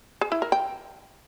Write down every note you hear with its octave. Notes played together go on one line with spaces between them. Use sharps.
G#4
E4
A#4
G5